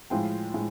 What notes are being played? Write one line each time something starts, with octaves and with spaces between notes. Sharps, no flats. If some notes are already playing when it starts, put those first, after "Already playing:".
A2 F3 G#3 G5
A2 G#3